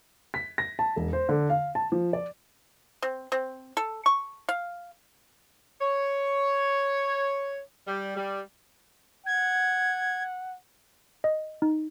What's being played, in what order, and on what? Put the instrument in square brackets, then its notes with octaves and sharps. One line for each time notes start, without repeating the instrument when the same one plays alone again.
[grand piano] B6
A#6
A5
E1
C5
D3
F5
A5
F3
D5
[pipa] C4
C4
A4
C#6
F5
[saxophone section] C#5
G3
G3
[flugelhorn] F#5 [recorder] G#6
[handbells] D#5
D#4